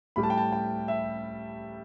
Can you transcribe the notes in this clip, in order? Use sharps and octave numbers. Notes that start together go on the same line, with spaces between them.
A2 G3 B5
A5
G5
A5
G5
E5